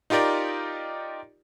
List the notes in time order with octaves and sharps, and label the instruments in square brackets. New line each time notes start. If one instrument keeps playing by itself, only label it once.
[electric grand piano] D#4 F4 G4 A#4 D5